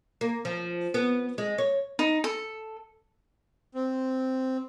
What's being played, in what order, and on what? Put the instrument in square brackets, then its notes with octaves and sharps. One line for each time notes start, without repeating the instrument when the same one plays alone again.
[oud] A#3
F3
B3
G#3
C#5
[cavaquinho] D#4
A4
[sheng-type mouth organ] C4